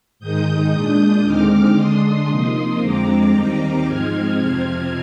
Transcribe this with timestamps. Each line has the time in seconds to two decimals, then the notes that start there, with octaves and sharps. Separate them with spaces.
0.19 G#2 D#3 G#3 D#4 D#6 G6
0.72 A#2 G#3 D4
1.23 D#2 D3 G#3 C4 D#4 D6 F6
1.76 D3 G#3 D4 C6 D#6
2.28 C3 F3 A#3 D#4
2.80 F2 D3 F3 G#3 C4 A#5 D6
3.33 D#2 D#3 G3 C4 D#4
3.84 G#2 F3 G#3 C4 D#4 F6 G#6
4.37 F2 C3 F3 C4